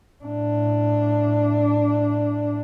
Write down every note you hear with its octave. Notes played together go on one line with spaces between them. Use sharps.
A2 D4